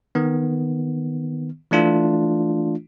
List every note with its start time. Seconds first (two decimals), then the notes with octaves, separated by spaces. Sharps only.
0.15 D#3 B3
1.71 E3 A3 D4 F4